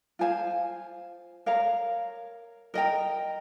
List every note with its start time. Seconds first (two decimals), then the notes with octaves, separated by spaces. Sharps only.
0.19 F4 C5 F5 G#5
1.46 A#4 C#5 F5 A#5
2.74 A#4 D#5 G5 A#5